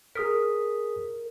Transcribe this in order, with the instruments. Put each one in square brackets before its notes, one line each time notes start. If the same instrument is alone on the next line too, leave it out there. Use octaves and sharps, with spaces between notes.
[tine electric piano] G#4 D#6 B6 [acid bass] A#4